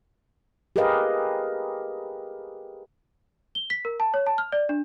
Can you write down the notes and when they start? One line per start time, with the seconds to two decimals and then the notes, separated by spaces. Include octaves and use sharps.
0.76 G4 G#4 A#4 B4 D#5 F5
3.55 G7
3.70 B6
3.85 A#4
4.00 A5
4.14 C#5
4.26 A5
4.38 F6
4.52 D5
4.69 D4